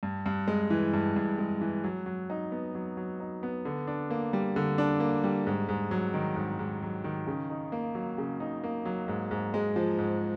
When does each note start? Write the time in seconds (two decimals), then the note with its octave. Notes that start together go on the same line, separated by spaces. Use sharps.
0.03 G2
0.26 G2
0.48 G#3
0.70 E3
0.93 G2
1.16 G2
1.38 G#3
1.61 E3
1.84 F#3
2.06 F#3
2.30 D#4
2.52 B3
2.75 F#3
2.97 F#3
3.20 D#4
3.43 B3
3.65 D3
3.87 D4
4.11 A#3
4.33 G3
4.56 D3
4.78 D4
5.00 A#3
5.24 G3
5.47 G#2
5.69 G#2
5.91 F#3
6.14 D#3
6.36 G#2
6.59 G#2
6.82 F#3
7.04 D#3
7.27 C#3
7.50 D#4
7.72 A#3
7.95 F#3
8.18 C#3
8.40 D#4
8.64 A#3
8.85 F#3
9.08 G#2
9.31 G#2
9.54 G#3
9.76 F3
9.99 G#2